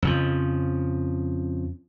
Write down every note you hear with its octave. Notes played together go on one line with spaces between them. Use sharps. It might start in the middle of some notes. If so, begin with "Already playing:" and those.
F2 C#3 F3